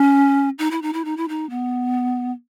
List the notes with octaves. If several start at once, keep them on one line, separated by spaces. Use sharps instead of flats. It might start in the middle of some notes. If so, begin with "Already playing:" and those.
Already playing: C#4
D#4
E4
D#4
E4
D#4
E4
D#4
B3